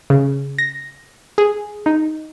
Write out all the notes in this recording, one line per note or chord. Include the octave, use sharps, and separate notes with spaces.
C#3
A#6
G#4
D#4